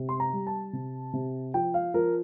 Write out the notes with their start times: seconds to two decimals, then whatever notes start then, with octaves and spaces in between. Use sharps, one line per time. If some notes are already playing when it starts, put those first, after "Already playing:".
Already playing: C3
0.09 C6
0.20 A#5
0.33 G3
0.47 A5
0.73 C3
1.13 C3
1.54 F3 G5
1.74 F5
1.94 F3 A#4